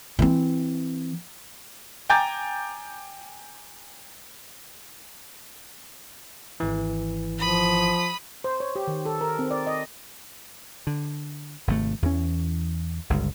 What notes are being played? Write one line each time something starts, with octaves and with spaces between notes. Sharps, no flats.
E3 C4
G5 G#5 A#5 D6 G6 A6
G#1 E3
F3 B5 D#6
C5
C#5
G4
D#3
A4
A#4
C4
D5
D#5
D3
G#1 C3 D#3 A3
E2 E3 C#4
G1 C#2 G2